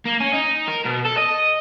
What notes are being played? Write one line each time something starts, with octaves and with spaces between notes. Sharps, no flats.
A#3
C#4
D#4
A#4
B2
A4
D#5